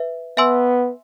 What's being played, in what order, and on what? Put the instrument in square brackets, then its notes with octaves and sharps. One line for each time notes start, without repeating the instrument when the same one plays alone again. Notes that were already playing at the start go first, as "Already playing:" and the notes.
Already playing: [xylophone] B4 E5
[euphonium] B3 [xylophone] E5 G#5 C6 E6